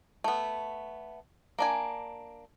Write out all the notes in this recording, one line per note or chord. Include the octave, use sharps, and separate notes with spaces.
A3 B3
A#3 D4 G#5